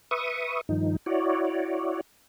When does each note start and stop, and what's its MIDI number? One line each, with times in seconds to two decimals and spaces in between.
0.11 0.61 71
0.11 0.61 76
0.11 0.61 85
0.11 0.61 87
0.69 0.96 43
0.69 0.96 51
0.69 0.96 53
0.69 0.96 63
1.06 2.01 64
1.06 2.01 66
1.06 2.01 73
1.06 2.01 74